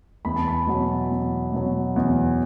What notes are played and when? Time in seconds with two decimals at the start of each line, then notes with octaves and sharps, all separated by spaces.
0.25 E2 B5
0.36 A5
0.48 B5
0.67 B2 F#3
1.10 E2
1.53 B2 F#3
1.96 E2